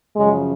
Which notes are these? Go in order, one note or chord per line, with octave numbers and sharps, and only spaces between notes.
F#2 C#3 F3 G#3